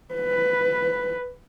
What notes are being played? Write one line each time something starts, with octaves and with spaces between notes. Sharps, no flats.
B4